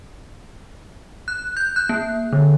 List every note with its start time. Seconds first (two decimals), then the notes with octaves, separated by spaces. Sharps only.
1.28 F#6
1.57 G6
1.76 F#6
1.89 A#3
2.33 D3